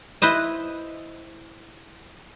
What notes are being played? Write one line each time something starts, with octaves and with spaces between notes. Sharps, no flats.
E4 B4 C5 D#5